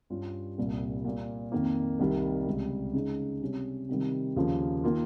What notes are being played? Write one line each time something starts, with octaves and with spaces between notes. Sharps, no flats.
G2 G3 C#4 F4
C2 A#2 G3
A#2 G3 A#3
F2 D#3 A#3
C2 C3 D#3 G3
C#2 C3 G3
C#3 G#3 D#4 G#4
C3 G3 C#4
C3 D#3 G3
D#2 C#3 F3 A#3 F4
D#3 A#3 F4